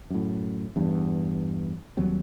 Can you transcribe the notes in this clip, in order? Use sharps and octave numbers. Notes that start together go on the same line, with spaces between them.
F#2 A2
E2 G2
D#2 F#3 G3 C4